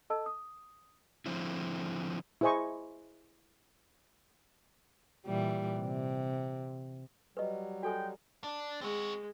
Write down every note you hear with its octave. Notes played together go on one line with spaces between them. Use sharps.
A4 D#5 A5 E6
D#6
D3 F3 C4 E4
E4 G#4 C5 D#5 G#5 C#6
A#2 E3 G3
C3
F#3 G3 B4 D#5
G#3 F#4 A4 G5 G#5
D4
G#3 C4 F#4